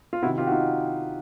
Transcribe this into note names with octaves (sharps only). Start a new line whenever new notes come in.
F4
C3 D#3 E4 F#4
F4 G4
F#4
D#4 F4